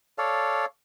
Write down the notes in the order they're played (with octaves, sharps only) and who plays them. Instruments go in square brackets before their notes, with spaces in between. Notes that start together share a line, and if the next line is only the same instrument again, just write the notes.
[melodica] A4 C#5 D5 F5